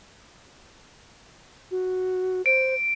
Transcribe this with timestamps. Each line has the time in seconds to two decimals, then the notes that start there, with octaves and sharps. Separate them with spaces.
1.71 F#4
2.46 C5 D7